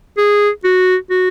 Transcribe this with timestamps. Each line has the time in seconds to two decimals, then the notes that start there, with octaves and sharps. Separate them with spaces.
0.17 G#4
0.64 F#4
1.10 F#4